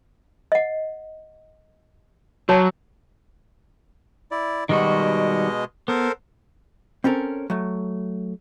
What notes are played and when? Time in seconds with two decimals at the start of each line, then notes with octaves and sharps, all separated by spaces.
0.52 D#5 F#5
2.49 F#3 F#4 C#5 A5
4.31 E4 D5
4.69 B2 D#3 G3 G#3 F#4 D#5
5.88 B3 A4 A#4 C5
7.04 C4 C#4 A4 A#4
7.50 F#3 A3